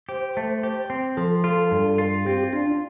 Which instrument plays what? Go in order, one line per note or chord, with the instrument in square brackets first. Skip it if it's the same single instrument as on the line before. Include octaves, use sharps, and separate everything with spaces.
[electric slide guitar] G4 [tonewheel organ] C5
[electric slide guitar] A3
G4
C4
[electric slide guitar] F3 [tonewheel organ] A4
[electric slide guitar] F4 [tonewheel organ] A4
[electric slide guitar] G2
F4
[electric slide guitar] C4 [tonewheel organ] G4
[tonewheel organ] D4 [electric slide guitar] F4